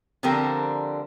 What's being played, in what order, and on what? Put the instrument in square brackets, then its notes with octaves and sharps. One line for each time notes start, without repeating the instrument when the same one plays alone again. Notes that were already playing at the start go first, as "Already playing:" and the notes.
[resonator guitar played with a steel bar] D3 F3 G3 C4 D4 A#4